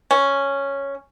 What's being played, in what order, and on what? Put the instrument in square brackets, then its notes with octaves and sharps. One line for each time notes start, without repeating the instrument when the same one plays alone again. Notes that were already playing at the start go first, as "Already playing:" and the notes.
[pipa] C#4